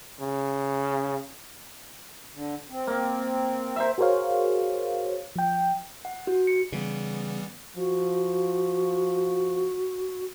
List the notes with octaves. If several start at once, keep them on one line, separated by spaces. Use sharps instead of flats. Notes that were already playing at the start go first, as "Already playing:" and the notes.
C#3
D3
C4
A#3
A#4 C5 E5
F#4 G#4 A#4 C5 C#5 F5
F3 G5
F#5
F#4
C#7
C#3 E3 G3 B3
F3 F#4